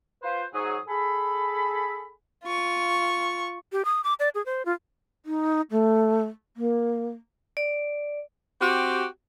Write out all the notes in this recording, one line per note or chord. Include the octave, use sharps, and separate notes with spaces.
F4 B4 C5
G#2 F#3 G#4 D#6
G#4 A4 B5
F4 C#6
G4
D#6
D6
D5
G#4
C5
F4
D#4
A3
A#3
D5
C4 F#4 G4